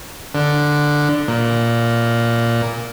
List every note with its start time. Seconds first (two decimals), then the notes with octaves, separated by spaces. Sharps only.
0.35 D3
1.28 A#2